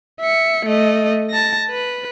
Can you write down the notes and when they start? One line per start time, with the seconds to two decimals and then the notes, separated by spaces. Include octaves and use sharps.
0.20 E5 C#7
0.66 A3 D#5
1.30 A5 A#6
1.70 B4